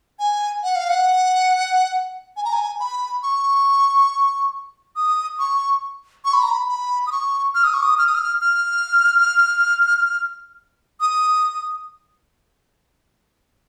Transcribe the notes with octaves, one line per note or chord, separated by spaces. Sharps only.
G#5
F#5
F5
F#5
G#5
A#5
G#5
B5
C#6
D#6
C#6
C#6
B5
A#5
B5
B5
D#6
C#6
F6
D#6
C#6
D#6
F6
D#6
F6
F6
D#6